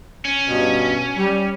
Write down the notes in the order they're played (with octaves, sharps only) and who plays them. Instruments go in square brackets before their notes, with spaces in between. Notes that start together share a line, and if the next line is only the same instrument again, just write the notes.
[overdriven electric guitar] C#4
[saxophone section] G2 B2
G3